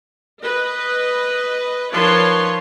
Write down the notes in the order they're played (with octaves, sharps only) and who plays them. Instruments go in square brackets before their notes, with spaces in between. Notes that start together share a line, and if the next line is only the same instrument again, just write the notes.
[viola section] B4 D#5
D#3 F3 B4 C#5 A5 C6